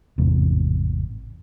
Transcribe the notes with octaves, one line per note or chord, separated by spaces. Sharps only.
G#1 E2 A2 C3